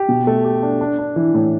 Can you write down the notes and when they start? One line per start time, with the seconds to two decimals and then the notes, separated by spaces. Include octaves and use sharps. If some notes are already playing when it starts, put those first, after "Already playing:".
Already playing: G4
0.09 B2
0.27 A3
0.44 G4
0.63 D4
0.81 D4
0.99 D4
1.16 E3
1.34 A2